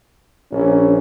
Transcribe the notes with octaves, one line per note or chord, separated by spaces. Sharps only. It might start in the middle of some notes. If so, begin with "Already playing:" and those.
A#1 C#4